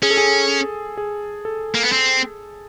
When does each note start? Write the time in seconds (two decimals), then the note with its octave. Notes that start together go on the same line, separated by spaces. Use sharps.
0.03 C#4 G#4
0.10 A4
0.17 G#4
0.97 G#4
1.45 A4
1.75 A#3
1.83 B3
1.92 C4